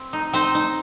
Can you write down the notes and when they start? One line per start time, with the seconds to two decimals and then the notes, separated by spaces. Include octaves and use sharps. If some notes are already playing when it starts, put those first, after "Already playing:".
Already playing: C4
0.13 D#4
0.33 C4 D#4 C5
0.55 D#4